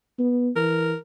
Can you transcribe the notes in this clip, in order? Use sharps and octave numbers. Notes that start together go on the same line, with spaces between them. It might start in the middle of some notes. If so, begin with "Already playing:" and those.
B3
E3 A#4